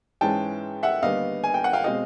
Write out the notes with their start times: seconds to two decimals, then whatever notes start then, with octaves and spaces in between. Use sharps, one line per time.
0.21 G#2 E3 G#3 C#4 G5 A5
0.83 E5 F#5
1.02 D#2 D3 G3 B3 D#5 F5
1.44 G#5
1.54 G5
1.64 F#5
1.73 F5 G5
1.84 B2 G#3 C4 D#5 F5